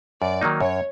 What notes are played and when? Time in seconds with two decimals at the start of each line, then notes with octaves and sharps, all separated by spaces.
0.22 F#2 D5
0.41 D#3 F#3 A#3 D#4
0.61 F#2 C#5